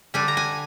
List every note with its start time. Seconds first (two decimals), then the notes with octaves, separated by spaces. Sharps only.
0.14 D3 G3 D4 G#5
0.28 A#5
0.37 G#5